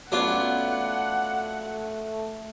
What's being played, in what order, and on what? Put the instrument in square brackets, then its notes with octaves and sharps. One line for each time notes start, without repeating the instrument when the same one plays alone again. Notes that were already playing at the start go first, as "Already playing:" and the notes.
[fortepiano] F#3 B3 C#4 [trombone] A3 [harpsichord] D4 F4 [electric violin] F#5